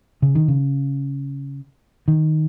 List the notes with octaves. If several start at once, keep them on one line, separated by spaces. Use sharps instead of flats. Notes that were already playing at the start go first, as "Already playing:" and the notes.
C#3
D#3
C#3
D#3